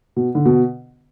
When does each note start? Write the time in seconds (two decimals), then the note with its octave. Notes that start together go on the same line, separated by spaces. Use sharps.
0.16 B2
0.35 D3
0.45 B2